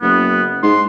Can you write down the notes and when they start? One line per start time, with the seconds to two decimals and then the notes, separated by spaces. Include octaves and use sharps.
0.02 F#1 B3
0.63 G#2 C6